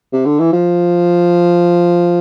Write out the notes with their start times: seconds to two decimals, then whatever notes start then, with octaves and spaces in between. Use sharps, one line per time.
0.13 C3
0.26 D3
0.40 E3
0.53 F3